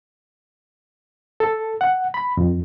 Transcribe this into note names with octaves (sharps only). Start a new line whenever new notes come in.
A4
F#5
B5
F2